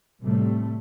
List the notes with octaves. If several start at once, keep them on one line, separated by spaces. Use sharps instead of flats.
A2 C3 G3 A3